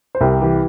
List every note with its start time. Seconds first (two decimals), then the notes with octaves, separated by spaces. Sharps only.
0.15 C5
0.21 C2 G4 A#4
0.41 E3 G4